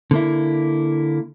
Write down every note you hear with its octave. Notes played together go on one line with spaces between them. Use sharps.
D3 A#3 E4